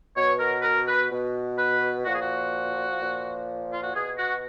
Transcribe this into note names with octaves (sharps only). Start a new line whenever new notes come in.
B2 C#5
A#4
B4
A#4
B4
B2
B4
A#2 F3 F#4 G#4
F#4
A#2 F3
F4
F#4
B2 G#4
F#4